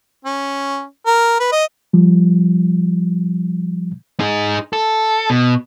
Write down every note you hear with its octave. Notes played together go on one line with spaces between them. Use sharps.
C#4
A#4
B4
D#5
F3 G3
D#4 G#4
A4
B2